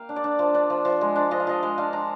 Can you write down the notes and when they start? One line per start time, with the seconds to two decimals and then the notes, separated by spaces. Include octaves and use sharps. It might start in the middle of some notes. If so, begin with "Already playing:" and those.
Already playing: A#3 F5 G5
0.09 D4
0.16 D5
0.24 D4
0.39 F3
0.55 D4
0.70 F3
0.85 F3
1.01 G#3
1.16 D4
1.31 F3 D#5
1.40 F5
1.47 F3 D#5
1.63 G#3
1.78 D4 F5
1.93 D4 A#5